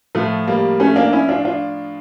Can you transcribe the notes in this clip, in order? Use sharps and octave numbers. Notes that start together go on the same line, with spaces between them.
A2 F3 A3
G3 A#3
A3 C#4
A#3 D4
C#4 E4
D4 F4
D4 F4